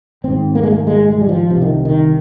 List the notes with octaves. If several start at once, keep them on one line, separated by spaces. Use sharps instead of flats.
G#1 G#2 C4
A#3
G#3
A#3
G#3
G#3
G3
F3
C2 C3 F3
D#3
D#3